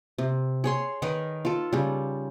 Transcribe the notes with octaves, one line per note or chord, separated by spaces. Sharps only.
C3
G#4 C#5 C6
D#3 D#4 A#4 B4
F4 A4
C#3 G3